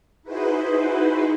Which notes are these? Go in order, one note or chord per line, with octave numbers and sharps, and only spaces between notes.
D#4 E4 F#4 G#4 B4 C5